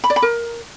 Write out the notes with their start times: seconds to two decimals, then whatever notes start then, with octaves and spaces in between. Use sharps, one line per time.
0.04 B5
0.10 D5
0.16 B5
0.22 A#4